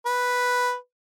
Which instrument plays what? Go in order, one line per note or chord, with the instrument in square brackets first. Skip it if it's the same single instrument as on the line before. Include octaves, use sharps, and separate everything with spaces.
[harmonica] B4